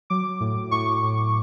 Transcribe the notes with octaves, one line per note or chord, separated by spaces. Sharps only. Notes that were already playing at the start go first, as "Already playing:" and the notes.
F#3 D6
A2
A2 C#6
A2